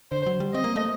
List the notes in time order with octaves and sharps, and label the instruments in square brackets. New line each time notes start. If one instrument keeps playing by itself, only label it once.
[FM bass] D3 [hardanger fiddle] C5
[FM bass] F#3
G3
[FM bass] C4 [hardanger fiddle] D#5
[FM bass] A#3
A3